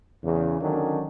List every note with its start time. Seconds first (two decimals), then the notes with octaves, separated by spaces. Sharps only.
0.22 E2 C#3
0.59 D3 D#3 F#3 C#4 D4